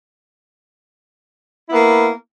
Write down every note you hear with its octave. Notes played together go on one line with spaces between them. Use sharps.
A#3 B3 E4